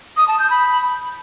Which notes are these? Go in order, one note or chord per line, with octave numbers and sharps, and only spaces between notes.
D#6
A5
G6
B5